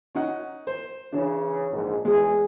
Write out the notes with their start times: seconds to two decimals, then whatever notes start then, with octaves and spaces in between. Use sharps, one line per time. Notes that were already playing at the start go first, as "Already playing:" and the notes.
0.15 C#4 D#4 F#5
0.67 C5
1.12 C#3 E3 D4
1.72 A#1 G#2
2.05 E2 G#3 G#4